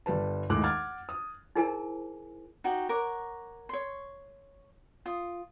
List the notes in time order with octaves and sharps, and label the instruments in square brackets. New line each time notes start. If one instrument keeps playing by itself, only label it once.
[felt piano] G1 G3 B4 A5
D#2 A2 G#3 D6 F#6
F#5 D6 F6 G#6 A6
D#6
[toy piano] D#4 E4 G#4 A#4 C5 G#5
[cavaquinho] D#4 F#4 G4
A#4 C#5 F#5 D6
C#5 C6
F4 D#6